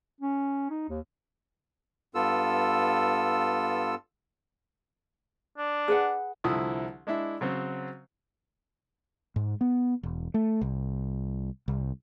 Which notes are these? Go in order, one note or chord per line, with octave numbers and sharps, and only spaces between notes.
C#4
D#4
D#2
G2 B3 F4 A4 E6
D4
G#4 B4 F#5
C2 D3 F3 E4 E5 D#6
G#3 D4 E4 E5
C#3 F#3 C4
G#2
B3
E1
A3
C2
C2